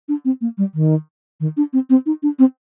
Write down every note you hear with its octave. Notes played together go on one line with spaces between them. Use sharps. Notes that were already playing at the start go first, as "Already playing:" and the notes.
D4
C4
A#3
G3
D#3
D#3
D4
C4
C4
D#4
D4
C4